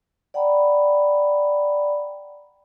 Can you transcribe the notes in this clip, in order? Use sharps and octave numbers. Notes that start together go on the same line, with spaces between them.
D5 F#5 G5 A#5 B5